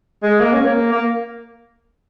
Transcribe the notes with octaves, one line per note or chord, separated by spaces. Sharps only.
G#3
A#3
C#4
A#3
A#3